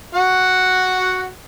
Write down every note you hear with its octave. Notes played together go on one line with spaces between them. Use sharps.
F#4 F#5